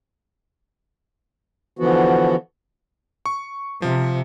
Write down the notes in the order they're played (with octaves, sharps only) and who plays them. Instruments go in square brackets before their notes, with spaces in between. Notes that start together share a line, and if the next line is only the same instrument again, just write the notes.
[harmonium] D3 E3 F3 B3 F#4
[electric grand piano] C#6
[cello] C3 [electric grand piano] F3